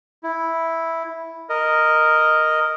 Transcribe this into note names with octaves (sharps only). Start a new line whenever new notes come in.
E4
A#4 D#5